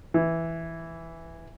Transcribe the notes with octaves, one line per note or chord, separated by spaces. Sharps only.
E3